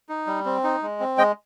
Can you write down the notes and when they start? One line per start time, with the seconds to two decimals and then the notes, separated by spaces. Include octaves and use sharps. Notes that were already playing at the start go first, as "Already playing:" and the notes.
0.09 D#4
0.27 G3
0.46 C4
0.64 D#4
0.82 G#3
1.00 C4
1.18 G#3 D#5 G5